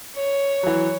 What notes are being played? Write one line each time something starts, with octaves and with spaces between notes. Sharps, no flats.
C#5
E3 F#3